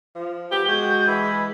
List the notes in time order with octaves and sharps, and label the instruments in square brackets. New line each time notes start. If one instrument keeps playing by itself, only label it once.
[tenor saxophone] F3
[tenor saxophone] B3 [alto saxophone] G4 [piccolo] G7
[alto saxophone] G#3 [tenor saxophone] F#4 [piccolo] G6
[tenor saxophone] E3 [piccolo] B5